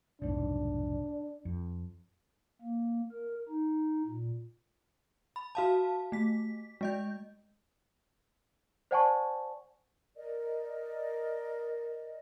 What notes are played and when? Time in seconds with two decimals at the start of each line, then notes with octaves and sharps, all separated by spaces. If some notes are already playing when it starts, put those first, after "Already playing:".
0.22 F1 B1 G#2 D4
1.45 F2
2.61 A#3
3.12 A#4
3.49 D#4
4.06 A#2
5.36 B5
5.55 F#4 F5 A5
6.12 A3 B6
6.81 G#3 D#5 G6
8.91 C5 D5 F#5 G#5 A5 C#6
10.16 A#4 D5 D#5